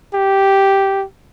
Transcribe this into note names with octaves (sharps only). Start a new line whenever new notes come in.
G4